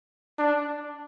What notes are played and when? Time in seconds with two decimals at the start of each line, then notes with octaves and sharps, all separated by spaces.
0.39 D4